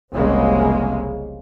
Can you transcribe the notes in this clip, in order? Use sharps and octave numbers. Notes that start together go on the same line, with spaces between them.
F1 C2 C#3 G#3 A#3